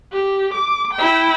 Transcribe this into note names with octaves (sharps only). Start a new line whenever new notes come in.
G4
D6
E4 G5